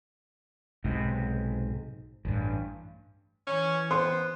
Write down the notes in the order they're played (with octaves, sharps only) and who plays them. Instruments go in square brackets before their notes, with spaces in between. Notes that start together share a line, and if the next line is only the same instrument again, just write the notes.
[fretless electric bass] B1 G#2 C3
A1 G2
[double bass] E3 [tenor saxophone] C#4
[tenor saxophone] B3 [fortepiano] C5 [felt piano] C6